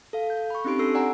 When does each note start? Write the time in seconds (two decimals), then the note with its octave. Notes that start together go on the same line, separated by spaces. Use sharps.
0.13 A4 F5
0.30 G6
0.50 B5 C#6
0.65 C4 C#4 D#4 G4 C6 D7
0.79 D4 A4 E6 C7
0.95 D5 F#5 G#5 A#5